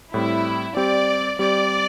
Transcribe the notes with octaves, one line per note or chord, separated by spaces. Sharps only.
A2 G3 C4 E4
G3 C4 G4 D5
G3 C4 G4 D5